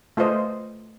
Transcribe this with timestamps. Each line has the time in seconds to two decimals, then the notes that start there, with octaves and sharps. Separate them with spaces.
0.17 A3 F4 B4 C5 D#5